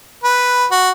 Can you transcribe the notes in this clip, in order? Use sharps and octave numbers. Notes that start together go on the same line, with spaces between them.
B4
F#4